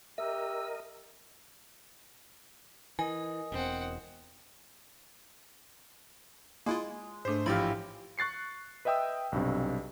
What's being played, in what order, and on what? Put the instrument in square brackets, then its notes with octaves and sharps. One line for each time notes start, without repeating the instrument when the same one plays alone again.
[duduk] G4 [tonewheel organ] A#4 D#5 [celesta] E5 [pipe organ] E6
[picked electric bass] E3 [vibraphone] A#4 D#5 D#6 [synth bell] G#5
[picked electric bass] E1 E2 [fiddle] C4 F#5
[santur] G#3 [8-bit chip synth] A#3 E4 F4
[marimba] G#2 D4 [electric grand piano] A3 C5
[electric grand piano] A1 F3 G4 [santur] E4 F5 [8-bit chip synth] B5 A6
[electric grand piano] C#6 F#6 A6 C7 C#7
B4 D#5 E5 G5 D#6 E6
B1 G2 C3